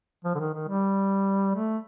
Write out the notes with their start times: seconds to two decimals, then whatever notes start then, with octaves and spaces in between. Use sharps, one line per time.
0.25 F3
0.35 D3
0.39 D#3
0.54 D#3
0.68 G3
1.55 A3